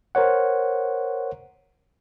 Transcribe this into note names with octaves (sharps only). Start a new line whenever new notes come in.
A#4 C5 C#5 F#5